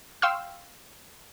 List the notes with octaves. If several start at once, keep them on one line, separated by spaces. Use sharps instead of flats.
F5 G5 C6 C#6 E6 F6